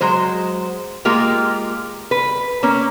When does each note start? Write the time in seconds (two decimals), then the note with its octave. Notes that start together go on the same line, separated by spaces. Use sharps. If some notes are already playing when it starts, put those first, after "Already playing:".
0.01 F#3 G#3 C5
1.05 G#3 A#3 F4 G4
2.11 B4
2.63 A#3 C#4